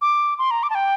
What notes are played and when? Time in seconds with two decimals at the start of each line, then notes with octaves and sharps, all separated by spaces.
0.01 D6
0.39 C6
0.51 A#5
0.63 D6
0.70 A5
0.75 G5